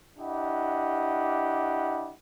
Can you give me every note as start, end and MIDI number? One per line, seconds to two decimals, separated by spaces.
0.18 2.13 62
0.18 2.13 64
0.18 2.13 67
0.18 2.13 75
0.18 2.13 78